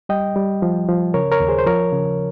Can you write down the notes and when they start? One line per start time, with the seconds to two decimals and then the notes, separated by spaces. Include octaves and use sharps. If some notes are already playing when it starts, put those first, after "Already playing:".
0.09 G3 D#5 G5
0.36 G3
0.62 F3
0.89 F3
1.14 C#3 A#4 C#5
1.32 A#4 C#5
1.40 D#2
1.49 G#4 C5
1.59 C5
1.67 F3 A#4 C#5
1.92 C#3